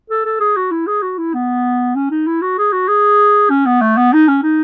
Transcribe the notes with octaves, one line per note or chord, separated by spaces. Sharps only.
A4
A4
G#4
F#4
E4
G#4
F#4
E4
B3
C#4
D#4
E4
F#4
G#4
F#4
G#4
C#4
B3
A3
B3
D#4
C#4
D#4